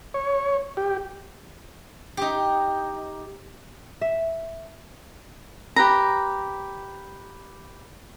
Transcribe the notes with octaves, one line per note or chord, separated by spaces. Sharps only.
C#5
G4
D#4 G4
E5
G4 B4 A#5